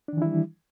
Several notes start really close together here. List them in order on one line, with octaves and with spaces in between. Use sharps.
D4 D#3 E3 E4 G3